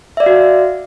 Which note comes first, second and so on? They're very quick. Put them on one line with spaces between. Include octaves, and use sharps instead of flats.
E5 D5 F5 F#4